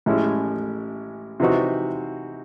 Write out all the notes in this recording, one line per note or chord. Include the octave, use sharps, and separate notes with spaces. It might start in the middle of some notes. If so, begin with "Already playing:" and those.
A1 A2 G#3 C#4 E4
C3 E3 C4 D#4 F#4